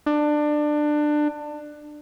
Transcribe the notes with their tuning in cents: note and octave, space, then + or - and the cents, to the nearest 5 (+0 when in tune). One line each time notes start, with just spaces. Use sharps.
D4 +20